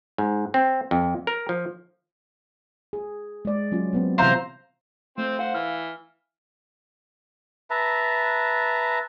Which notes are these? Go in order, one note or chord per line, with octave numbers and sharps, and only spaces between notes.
G#2
C4
F2
A#4
F3
G#4
G#3 D5
F#3 C#4 F4
F#3 B3 C4
C3 E3 C5 E5 F5 A#5
A3 C4 F4 C5
C5 F5 F#5
E3 F6
B4 E5 A5 A#5